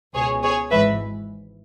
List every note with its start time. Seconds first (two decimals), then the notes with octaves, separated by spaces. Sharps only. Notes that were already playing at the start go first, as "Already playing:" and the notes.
0.15 C#2 B2 G#4 C#5
0.43 G#4 C#5
0.71 G#1 G#2 E3 B4 E5